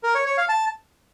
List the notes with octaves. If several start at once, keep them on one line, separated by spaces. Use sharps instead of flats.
A#4
C#5
C#5
F5
A5